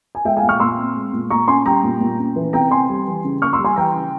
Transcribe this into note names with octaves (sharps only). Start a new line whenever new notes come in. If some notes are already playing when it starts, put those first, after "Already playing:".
G#5
G#3 E5 G5
F5 G#5
A#2
C#6 F6
A#2 C6 E6
C4
G#3
A#2
A#2 A#5 C#6
C#4 G#5 C6
G3 G5 A#5
A#2
A#2
C#4
E3
C3 G5 A#5
C4 G#5 C6
G3
E3
C#3
A#3 C#6 F6
C6 E6
G3
G#5 C6
E3 G5 A#5
C#3